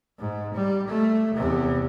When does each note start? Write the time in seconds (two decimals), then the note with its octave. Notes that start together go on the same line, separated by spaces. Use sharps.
0.19 G#2
0.54 G3
0.88 A3
1.35 E2 C3